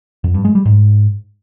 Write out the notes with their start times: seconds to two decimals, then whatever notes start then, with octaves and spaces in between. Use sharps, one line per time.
0.24 F2
0.34 G2
0.45 G#3
0.55 G3
0.65 G#2